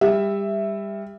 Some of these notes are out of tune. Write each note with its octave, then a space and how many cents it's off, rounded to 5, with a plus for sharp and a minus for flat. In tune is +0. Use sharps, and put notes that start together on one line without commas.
G3 +25 E5 +0